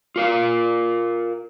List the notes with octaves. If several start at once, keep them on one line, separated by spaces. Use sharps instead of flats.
F4 A#4 F5